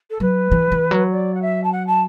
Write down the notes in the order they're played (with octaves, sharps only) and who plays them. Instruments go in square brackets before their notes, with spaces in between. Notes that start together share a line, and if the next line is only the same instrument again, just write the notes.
[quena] A4
[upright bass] F#3 [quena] B4
[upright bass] E3
E3
F#3
[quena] D5
F#5
E5
A5
F#5
A5